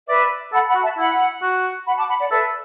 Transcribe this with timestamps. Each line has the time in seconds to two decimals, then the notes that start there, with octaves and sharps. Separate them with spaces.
0.08 B4 D5 E5
0.52 A4 F#5 B5
0.68 F#5 B5
0.75 F#4
0.83 E5 A5
0.97 E4 F#5 B5
1.42 F#4
1.86 F#5 B5
1.97 A5 D6
2.09 F#5 B5
2.19 D5 F#5
2.31 A4 B4 E5